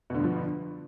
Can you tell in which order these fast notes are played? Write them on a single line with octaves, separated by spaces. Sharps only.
B2 D3 G2 F3